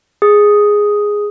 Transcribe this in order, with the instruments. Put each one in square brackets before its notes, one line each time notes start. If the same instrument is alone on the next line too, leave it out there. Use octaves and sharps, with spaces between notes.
[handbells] G#4